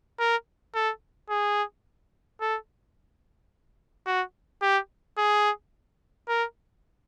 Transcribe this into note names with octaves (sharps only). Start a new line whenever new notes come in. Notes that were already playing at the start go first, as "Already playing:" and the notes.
A#4
A4
G#4
A4
F#4
G4
G#4
A#4